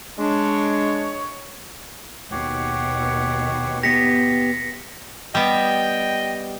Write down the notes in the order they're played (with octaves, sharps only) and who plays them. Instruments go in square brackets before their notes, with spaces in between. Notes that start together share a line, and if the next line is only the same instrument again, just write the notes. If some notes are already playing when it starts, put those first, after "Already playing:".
[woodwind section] G#3 D4 [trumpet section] C#5
[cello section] D#2 B2 [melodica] G4 C#5 F#5
[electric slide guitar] B3 G4 [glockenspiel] A#6 B6 C#7
[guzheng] G3 B3 [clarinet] D#5 [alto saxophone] G5